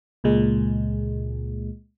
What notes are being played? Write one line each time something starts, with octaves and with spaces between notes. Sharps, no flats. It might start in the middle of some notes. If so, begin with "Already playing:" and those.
C#2 A#2 G#3